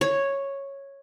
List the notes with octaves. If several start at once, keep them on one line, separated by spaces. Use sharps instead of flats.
C#5